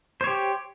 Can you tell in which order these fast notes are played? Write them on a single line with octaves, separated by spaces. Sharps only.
C5 C#5 G4